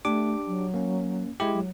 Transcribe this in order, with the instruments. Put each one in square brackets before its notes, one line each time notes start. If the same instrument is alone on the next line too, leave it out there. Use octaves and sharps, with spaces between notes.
[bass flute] A3 [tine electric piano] D4 G4 D6
[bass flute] F#3
[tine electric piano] A#3 C#4
G#3 E4 G4
[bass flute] F#3